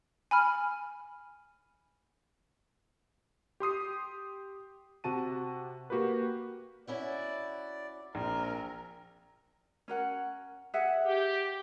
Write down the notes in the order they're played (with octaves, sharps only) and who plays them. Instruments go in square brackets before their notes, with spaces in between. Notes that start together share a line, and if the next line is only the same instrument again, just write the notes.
[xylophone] G#5 B5 F6
[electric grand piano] G4 C6 D#6 C7
C3 F#4 A5 D#7
A#3 F#4 G4 A#4 B4
[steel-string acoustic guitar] C#4 E4 F#4 [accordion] D5
[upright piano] A#1 [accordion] C4 [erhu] A#4
[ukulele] C#4 A#4 F#5
G#4 E5 F#5
[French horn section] G4